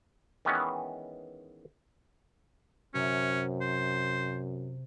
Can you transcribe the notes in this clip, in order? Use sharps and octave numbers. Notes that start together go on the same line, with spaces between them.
D#3 E3 G#3 B3 C#4 B4
F#2 C3 C#4
C5